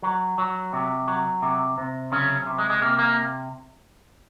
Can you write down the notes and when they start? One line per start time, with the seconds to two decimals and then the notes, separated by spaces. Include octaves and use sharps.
0.02 F#3
0.38 F#3
0.73 C3
1.08 F#3
1.42 C3
1.78 C3
2.12 C#3 F#3 C#4
2.47 C3
2.58 G#3
2.70 G#3
2.82 C3 A#3
2.99 A#3